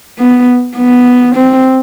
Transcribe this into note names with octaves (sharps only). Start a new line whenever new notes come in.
B3
B3
C4